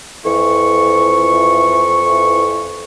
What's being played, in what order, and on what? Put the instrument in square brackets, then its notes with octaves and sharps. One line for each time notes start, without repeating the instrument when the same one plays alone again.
[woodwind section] F2 E3 C#6